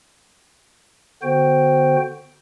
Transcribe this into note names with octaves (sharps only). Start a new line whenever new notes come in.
D3 B3 F#4 C5 G5